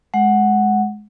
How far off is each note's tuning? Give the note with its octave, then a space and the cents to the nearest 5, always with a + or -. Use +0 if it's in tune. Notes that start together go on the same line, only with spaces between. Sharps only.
G#3 +15 F#5 +0